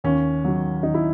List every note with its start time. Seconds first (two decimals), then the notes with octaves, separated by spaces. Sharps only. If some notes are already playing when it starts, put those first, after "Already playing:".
0.04 D#2 C#4
0.44 D#3 F#3
0.83 D#2 D#4
0.94 E4